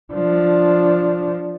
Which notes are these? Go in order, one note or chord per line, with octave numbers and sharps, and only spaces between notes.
F3 D4